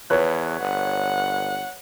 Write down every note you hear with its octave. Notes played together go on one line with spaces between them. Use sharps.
E2 B4 C#5 F#6
G1 F#5